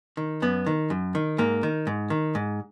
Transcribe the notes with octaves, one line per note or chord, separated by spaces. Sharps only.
D#3
F#2 B3
D#3
F#2
D#3
G#2 A#3
D#3
G#2
D#3
G#2